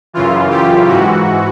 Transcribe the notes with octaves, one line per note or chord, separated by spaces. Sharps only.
F#2 C#3 E3 F4
G4
G#2 E3 F#4